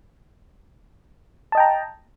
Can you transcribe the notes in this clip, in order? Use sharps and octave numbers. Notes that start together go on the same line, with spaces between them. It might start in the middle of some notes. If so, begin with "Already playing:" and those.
D#5 G5 A5 A#5